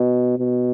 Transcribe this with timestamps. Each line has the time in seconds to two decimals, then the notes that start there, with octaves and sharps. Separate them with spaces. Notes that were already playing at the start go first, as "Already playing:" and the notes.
Already playing: B2
0.39 B2